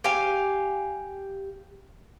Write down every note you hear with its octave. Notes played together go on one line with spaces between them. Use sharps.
G4 F5 G#5